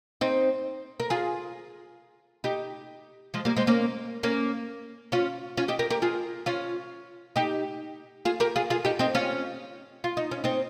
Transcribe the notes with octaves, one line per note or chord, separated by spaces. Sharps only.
C4 D#4
A#4
F4 G#4
D#4 G4
F3 G#3
G3 A#3
G#3 C4
A#3 C#4
A#3 C#4
C#4 F4
C#4 F4
D#4 G4
G4 A#4
G4 A#4
F4 G#4
C#4 F4
D#4 G4
F4 G#4
G4 A#4
F4 G#4
F4 G#4
D#4 G4
C4 D#4
C#4 F4
F4
D#4
C#4
C4 D#4